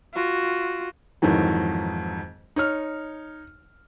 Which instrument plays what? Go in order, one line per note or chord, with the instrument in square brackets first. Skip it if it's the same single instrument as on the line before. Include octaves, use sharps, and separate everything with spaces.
[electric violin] F4 F#4
[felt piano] F2 G#2 D#3 E3 F#3
D#4 C#5 F6